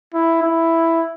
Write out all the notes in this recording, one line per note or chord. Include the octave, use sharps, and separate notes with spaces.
E4
E4